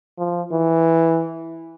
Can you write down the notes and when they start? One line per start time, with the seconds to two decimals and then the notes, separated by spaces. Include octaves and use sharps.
0.18 F3
0.53 E3